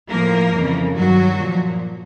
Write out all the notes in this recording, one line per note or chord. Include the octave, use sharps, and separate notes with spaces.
A2 F3 A#3 A#4
F2 C#3 E3
G2 D#3 F#3 F#4
A#2 F3